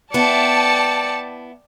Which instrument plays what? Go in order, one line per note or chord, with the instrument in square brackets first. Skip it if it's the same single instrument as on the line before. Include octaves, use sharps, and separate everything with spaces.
[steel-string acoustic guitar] B3 E4 [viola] D5 [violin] G5 C#7 [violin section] A5